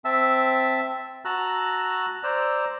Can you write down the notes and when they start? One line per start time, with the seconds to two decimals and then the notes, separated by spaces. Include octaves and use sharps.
0.05 C4 E5 A5 E6
1.25 F#4 A5 A#5 E6 F#6
2.23 C5 D5 A#5 E6